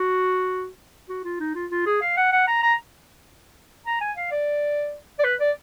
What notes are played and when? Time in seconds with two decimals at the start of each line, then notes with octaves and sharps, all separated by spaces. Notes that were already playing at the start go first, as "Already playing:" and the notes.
Already playing: F#4
1.09 F#4
1.24 F4
1.40 D#4
1.55 F4
1.71 F4
1.86 G#4
2.01 F5
2.17 F#5
2.32 F#5
2.47 A#5
2.63 A#5
3.86 A#5
4.01 G#5
4.17 F5
4.31 D5
5.19 D5
5.24 B4
5.40 D5